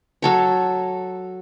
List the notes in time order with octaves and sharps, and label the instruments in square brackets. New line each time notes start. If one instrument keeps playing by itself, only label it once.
[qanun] F#3 A4 C#5